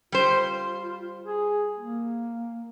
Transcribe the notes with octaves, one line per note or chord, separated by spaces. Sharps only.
G3 F4 C5
G#4
A#3